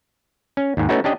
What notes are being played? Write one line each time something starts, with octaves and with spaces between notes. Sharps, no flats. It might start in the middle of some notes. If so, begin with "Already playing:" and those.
C#4
D#2 G#2
A3 B3 C#4 D#4 E4 F#4
C#4 D4 G4 D#5